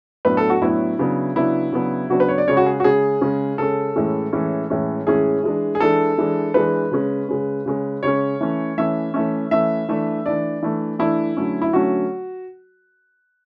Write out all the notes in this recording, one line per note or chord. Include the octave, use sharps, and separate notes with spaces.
A2 F#3 B3 D4 B4
A4
F#4
A2 F#3 B3 D4 E4
C#3 F#3 B3 D4
C#3 F#3 B3 D4 E4
C#3 F#3 B3 D4
C#3 F#3 B3 D4 F#4
B4
C#5
D5
C#3 G#3 C#4 C#5
F#4
G#4
F#4
C#3 G#3 C#4 G#4
C#3 G#3 C#4
C#3 G#3 C#4 A4
A2 E3 G#3 C#4
A2 E3 G#3 C#4
A2 E3 G#3 C#4
A2 E3 G#3 C#4 G#4
E3 G#3 D4
G#4
E3 G#3 D4 A4
E3 G#3 D4
E3 G#3 D4 B4
C#3 G#3 C#4
C#3 G#3 C#4
C#3 G#3 C#4
C#3 G#3 C#4 C#5
E3 A3 C#4
E3 A3 C#4 E5
E3 A3 C#4
E3 A3 C#4 E5
E3 A3 D4
E3 A3 D4 D5
E3 A3 D4
E3 A3 D4 E4
D3 F#3 A3 C#4
E4
D3 F#3 A3 C#4 F#4